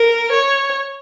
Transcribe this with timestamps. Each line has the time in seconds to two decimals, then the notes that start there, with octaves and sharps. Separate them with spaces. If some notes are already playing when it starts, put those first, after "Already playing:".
Already playing: A#4
0.32 C#5